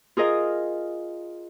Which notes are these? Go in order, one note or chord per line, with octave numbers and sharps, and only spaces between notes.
F4 G#4 A#4 D#5